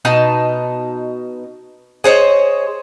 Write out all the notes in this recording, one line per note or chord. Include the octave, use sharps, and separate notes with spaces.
B2 D#4 A5
G#4 C5 C#5 D#5